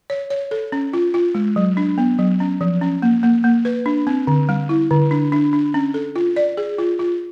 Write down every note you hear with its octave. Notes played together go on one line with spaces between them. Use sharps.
C#5
C#5
A4
C#4
F4
F4
G#3
F#3
D4
B3
F#3
C#4
F3
C#4
A#3
A#3
A#3
B4
D4
C4
D3
G3
E4
D3
D4
D4
D4
C#4
A4
F4
D5
G#4
F4
F4